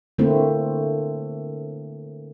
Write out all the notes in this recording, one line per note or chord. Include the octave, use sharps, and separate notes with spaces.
D3 A3 A#3 C4 E4